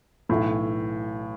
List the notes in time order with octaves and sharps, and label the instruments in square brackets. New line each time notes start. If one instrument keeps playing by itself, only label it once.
[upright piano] B1 A2 E3